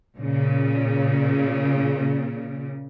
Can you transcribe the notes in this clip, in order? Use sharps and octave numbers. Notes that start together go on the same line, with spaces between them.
A#2 C#3